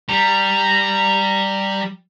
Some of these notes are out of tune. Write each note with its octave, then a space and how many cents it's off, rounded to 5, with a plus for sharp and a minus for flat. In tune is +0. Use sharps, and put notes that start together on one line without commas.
G3 +0 A#5 -10